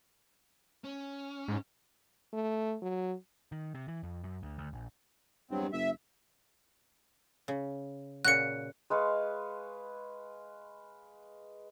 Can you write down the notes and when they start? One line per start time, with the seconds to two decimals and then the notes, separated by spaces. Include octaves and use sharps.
0.84 C#4
1.48 G#2
2.33 A3
2.82 F#3
3.52 D#3
3.75 C3
3.88 E3
4.03 F2
4.24 F#2
4.43 D2
4.58 D2
4.73 A#1
5.51 E2 G2 F#3 C4
5.73 F#1 E5
7.48 C#3
8.25 A#2 C#3 F#4 F#6 C#7
8.90 G#3 B4 F5 C#6